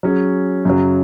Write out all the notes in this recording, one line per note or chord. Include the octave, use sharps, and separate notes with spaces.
F#3 C#4 G#4 C#5
F#2 C#3 F#3